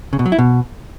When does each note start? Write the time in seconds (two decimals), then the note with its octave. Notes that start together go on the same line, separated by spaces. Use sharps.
0.13 C#3
0.19 B2
0.26 F#3
0.32 E4
0.39 B2